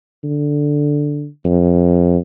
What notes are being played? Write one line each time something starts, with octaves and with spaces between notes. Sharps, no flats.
D3
F2